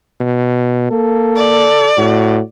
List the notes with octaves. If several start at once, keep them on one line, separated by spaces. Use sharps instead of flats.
B2
A#3 A4
D5
A2 F#4